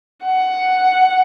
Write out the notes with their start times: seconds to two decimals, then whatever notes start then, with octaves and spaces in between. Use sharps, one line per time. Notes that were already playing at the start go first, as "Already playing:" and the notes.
0.25 F#5